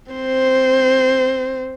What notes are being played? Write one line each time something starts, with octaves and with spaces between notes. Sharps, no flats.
C4 C5